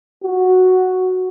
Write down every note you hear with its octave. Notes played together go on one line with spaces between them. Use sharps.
F#4